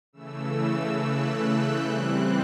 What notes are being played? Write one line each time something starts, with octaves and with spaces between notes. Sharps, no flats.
C#3 E3 A3 E6
F#6
F#6
G6
E3 G3 C4 F#6